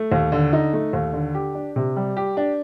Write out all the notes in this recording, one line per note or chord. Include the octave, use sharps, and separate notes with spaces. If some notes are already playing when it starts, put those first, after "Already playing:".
Already playing: A3
D#2
D3
D#4
A3
D#2
D3
G4
D4
C3
G3
G4
D4